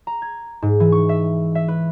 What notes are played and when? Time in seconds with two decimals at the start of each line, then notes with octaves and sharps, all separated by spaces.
0.07 A#5
0.22 G#6
0.62 G#2
0.80 E3
0.92 C#6
1.09 E5
1.55 E5
1.68 B4